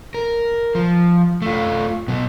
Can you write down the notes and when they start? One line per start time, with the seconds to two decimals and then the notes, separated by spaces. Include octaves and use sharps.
0.14 A#4
0.75 F3
1.42 A3 F4
2.08 B2 F#3